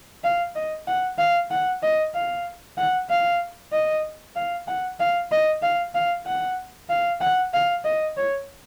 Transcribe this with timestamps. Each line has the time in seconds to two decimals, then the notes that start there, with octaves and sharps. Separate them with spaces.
0.24 F5
0.55 D#5
0.88 F#5
1.18 F5
1.51 F#5
1.83 D#5
2.14 F5
2.78 F#5
3.10 F5
3.72 D#5
4.36 F5
4.68 F#5
5.00 F5
5.32 D#5
5.62 F5
5.95 F5
6.26 F#5
6.89 F5
7.21 F#5
7.54 F5
7.84 D#5
8.17 C#5